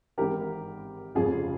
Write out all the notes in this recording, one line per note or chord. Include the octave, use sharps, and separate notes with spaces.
G#1 G#2 E3 G4 A#4
F1 F2 C#3 F4 G#4